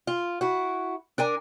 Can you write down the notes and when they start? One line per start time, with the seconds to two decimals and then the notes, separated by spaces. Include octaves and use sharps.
0.07 F4
0.41 E4 F#4
1.18 D4 A#4 G#5